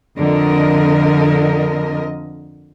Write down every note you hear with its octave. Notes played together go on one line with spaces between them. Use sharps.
F2 D3 A#4 D#5